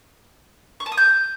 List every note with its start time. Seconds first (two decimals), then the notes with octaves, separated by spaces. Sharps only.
0.80 C#6
0.86 A5
0.92 D#6
0.97 G6